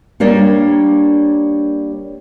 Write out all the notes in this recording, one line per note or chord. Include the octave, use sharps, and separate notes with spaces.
G3 A#3 D4 C#5